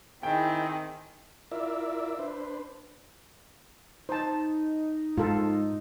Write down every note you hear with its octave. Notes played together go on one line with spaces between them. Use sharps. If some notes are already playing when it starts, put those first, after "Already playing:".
D#3 C4 E4 G#4 G5
E4 F4 A#4 D5 E5
D4 B4 C5
D#4 C5 A5
G#2 F4 A4